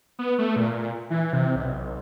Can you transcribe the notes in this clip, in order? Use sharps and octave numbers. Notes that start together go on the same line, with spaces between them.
B3
A3
A#2
E3
C3
B1